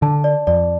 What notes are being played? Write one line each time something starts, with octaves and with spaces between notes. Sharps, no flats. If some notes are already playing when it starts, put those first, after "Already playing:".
D3 A5
D5
F2 D5